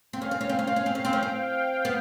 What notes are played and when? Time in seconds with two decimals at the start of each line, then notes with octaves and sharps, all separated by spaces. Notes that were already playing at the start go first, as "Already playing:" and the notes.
0.13 C4 F5
0.22 C#4
0.31 C4
0.41 C#4
0.49 C4
0.59 C#4
0.68 C4
0.76 C#4
0.86 C4
0.95 C#4 G5
1.05 C4
1.13 C#4
1.23 C4
1.85 B3